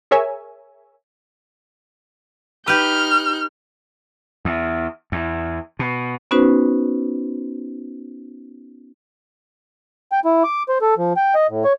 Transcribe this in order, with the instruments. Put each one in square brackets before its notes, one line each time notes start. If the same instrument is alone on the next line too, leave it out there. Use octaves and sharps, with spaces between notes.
[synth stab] G#4 A#4 C#5 E5 G#5
[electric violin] D#4 G6 [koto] G4 B4 [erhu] F6
[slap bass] E2
E2
B2
[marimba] B3 C#4 D#4 F#4 B4 C5
[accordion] G5
E4
D6
C5
A4
F3
G5
D#5
A2
C#5